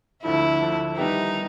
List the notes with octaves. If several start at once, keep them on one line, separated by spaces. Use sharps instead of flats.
D2 D3 F3 E4
D2 D3 F3
D#3 G3 B3 D#4 E4 G4